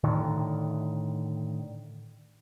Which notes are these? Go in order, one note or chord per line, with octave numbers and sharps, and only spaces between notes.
A2 D3 D#3